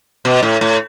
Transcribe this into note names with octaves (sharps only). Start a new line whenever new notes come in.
B2
A2
A2